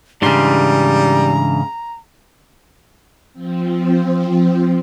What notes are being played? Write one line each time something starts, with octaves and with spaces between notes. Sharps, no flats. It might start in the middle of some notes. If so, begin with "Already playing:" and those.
G#2 C#3 E3 G3 D4 A#5 C6
F3 C4